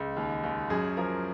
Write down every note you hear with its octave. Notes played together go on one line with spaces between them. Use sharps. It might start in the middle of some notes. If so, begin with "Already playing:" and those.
Already playing: C#2
D#2
D#2
F#2 G#4
F3 A#4